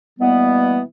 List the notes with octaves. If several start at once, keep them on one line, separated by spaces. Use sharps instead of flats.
B2 E3 G3 A#3 B3